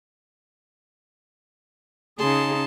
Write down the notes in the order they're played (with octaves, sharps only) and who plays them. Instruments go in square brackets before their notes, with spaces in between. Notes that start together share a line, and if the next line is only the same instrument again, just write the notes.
[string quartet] C#3 D#4 [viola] G#4 [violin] A5 C6